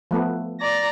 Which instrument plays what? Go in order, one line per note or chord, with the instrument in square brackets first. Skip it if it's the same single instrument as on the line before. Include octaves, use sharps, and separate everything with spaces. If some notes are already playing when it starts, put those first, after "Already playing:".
[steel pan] F3 A3 B3
[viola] D5 A#5